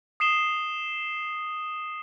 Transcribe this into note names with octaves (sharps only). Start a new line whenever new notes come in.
D#6 C7 E7 G7